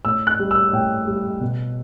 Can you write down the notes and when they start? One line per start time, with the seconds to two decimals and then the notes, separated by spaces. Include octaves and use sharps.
0.05 A2 E6
0.27 F#6
0.39 G3
0.51 E6
0.73 A2 G5
1.07 G3
1.41 B2